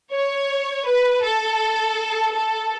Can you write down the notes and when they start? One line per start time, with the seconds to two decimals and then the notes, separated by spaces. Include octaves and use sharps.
0.14 C#5
0.88 B4
1.24 A4
2.35 A4